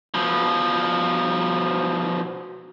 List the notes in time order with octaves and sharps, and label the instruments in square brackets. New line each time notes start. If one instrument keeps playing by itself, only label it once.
[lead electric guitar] B2 F3